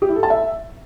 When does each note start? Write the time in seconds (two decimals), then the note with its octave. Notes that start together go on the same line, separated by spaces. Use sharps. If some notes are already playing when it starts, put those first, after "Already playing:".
0.02 G4
0.09 E4
0.16 A4
0.23 A5
0.30 E5